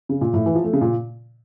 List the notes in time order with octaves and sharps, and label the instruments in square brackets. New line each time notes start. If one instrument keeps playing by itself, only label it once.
[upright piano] C#3
A#2
A2
E3
F3
A3
C#3
A#2